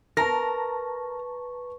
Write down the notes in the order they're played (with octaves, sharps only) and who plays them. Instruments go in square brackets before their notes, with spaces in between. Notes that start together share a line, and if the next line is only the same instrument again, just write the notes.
[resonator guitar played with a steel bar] A#4 [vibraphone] B4 C#6 [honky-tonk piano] A5 A#5 A#6